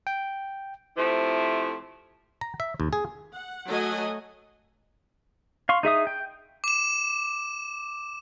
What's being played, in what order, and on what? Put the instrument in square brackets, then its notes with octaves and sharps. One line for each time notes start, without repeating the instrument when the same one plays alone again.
[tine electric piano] G5
[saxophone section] C3 F3 A3 E4
[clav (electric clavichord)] A#5
E5
D#2
G#4
[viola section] F#5
F#3 A3 A4 D#5 F#5 G#5
[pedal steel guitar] F5 C6 C#6
D#4 G#4 E5 D#6
G5
[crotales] D6 E7